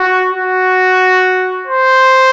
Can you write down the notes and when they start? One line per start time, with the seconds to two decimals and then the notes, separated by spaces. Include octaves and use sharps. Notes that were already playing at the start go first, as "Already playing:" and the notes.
Already playing: F#4
0.32 F#4
1.67 C5